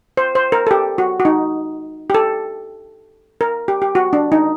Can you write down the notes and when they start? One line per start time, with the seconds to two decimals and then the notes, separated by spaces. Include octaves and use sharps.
0.17 C5
0.35 C5
0.52 A#4
0.67 A4
0.71 G4
0.98 F#4
1.20 F#4
1.25 D#4
2.10 G4
2.14 A4
3.41 A#4
3.68 G4
3.82 G4
3.95 F#4
4.13 D4
4.32 D#4